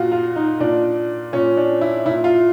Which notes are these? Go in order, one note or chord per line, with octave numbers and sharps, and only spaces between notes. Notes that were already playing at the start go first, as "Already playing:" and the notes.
Already playing: A#2 F4 F#4
F4
D#4
A#2 D4
A#2 C#4
D4
E4
A#2 E4
F4